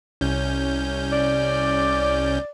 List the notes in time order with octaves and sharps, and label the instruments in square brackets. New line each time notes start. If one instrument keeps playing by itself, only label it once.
[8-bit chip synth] C2 C#4 G6
[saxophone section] D5